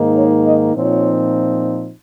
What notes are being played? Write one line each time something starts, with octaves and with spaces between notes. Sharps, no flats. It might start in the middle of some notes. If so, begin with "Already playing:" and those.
Already playing: G#2 D#3 A#3 D#4
C#5
D#5
A#2 F3 C4 D#4 C#5